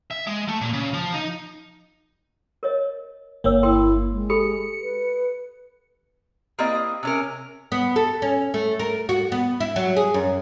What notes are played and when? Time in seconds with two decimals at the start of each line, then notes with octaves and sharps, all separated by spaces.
0.11 E5
0.27 G#3
0.48 A3
0.61 A#2
0.73 C#3
0.94 F3
1.14 D#4
2.63 A#4 C#5 D#5
3.44 G1 A#3 D4 C#5 E6
3.63 E4 A#4 G5 C6
4.11 G#3
4.30 G4 A4 B5 C#7
4.82 B4
6.59 A#3 C4 E4 G4 D5 D#5
7.03 C3 C#4 A#4
7.72 B3
7.96 A4
8.22 C#4
8.54 A3
8.79 A#4
9.09 F#4
9.32 B3
9.60 E4
9.76 F#3
9.96 G#4
10.14 F#2